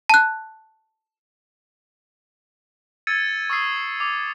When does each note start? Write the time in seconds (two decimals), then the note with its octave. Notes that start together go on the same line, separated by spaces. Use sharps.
0.10 A5 F#6
3.07 E6 G#6 A6 C#7 D#7
3.50 C#6 D#6 E6 C7
4.00 D6